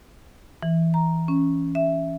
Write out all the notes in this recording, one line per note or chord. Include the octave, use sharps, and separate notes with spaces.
E3
A#5
C#4
E5